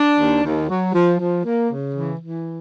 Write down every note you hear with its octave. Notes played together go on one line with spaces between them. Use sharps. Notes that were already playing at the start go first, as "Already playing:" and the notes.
Already playing: D4
D#2
D#2
F#3
F3
F3
A#3
C#3
E3
E3